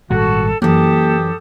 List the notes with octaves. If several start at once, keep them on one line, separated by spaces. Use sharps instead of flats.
G#1 A#2 G3 F#4 A4
F#2 E3 A#3 G4 A4 D#6